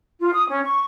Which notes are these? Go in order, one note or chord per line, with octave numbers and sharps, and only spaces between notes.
F4
D#6
C#4
C#6